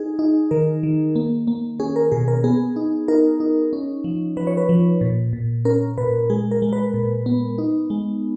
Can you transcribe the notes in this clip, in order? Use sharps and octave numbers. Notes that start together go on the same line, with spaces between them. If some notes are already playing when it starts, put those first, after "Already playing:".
Already playing: D#4 G#4
D#4
D#3 A#4
D#3
A#3
A#3
C#4 G#4
A#4
B2 G#4
A#4
B3 G#4
D#4
D#4 A#4
D#4
C#4
F3
F3 B4
C#5
B4
F3
A#2
A#2
C#4 A#4
A#2 B4
G#3 G#4
A#4
G#3
B4
A#2
B3
D#4
G#3